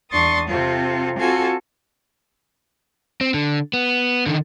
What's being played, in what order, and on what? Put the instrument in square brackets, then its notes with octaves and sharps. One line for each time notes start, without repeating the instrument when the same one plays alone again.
[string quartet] E2 D4 C6 C#6 D#6 A6
C3 C4 F4 A4
C4 F4 F#4 A4 G#5
[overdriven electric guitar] C4
D3
B3
D3 D#3